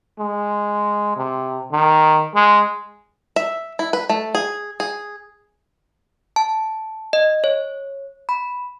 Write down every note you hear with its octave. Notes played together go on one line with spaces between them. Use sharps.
G#3
C3
D#3
G#3
E5
E4
B4
A3
G#4
G#4
A5
D#5
C#5
B5